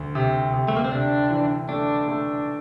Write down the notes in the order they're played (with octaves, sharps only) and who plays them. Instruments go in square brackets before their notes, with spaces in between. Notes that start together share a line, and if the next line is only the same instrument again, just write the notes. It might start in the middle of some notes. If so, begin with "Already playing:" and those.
Already playing: [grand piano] D2
C3
C3
[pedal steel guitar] A3
A#3
C4
[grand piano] C3 [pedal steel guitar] D4
[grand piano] E3
[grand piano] A3 [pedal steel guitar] D4
[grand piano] A3